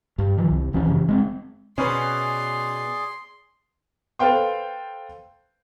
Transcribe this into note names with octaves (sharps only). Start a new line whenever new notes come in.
G2
D#3 F3
C2
D#1 E3 B3 C#4
F#2 C#3 E3
G#3 B3 C4
B2 C#4 G#4 B4 D5 C6
A4 B4 C5 F5 G5 C6